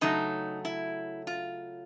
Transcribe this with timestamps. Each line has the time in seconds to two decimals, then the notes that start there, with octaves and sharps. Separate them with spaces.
0.01 C#3 F#3 A3 D#4
0.65 E4
1.27 F4